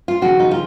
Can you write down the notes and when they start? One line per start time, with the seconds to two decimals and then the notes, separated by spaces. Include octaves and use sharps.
0.08 F4
0.21 D#2 C#3 F3 F#4
0.39 D#4
0.51 F4